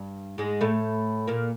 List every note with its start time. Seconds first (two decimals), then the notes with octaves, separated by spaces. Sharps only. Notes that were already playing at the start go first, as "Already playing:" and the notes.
Already playing: G2
0.38 G#2 G#3
0.61 A2 A3
1.28 A#2 A#3